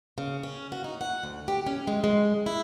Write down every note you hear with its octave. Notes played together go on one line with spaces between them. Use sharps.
C#3
C#4
F#4
D#4
F#5
D2
G4
C#4
G#3
G#3
E4